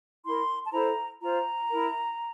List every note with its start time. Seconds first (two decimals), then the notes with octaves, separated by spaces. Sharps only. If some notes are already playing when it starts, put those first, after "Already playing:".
0.24 E4 A#4 C6
0.66 A5
0.73 E4 A4 C5 A#5
1.21 F4 C5 A#5
1.70 E4 A#4